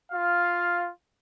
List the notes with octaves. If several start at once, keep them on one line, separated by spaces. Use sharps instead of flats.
F4 F5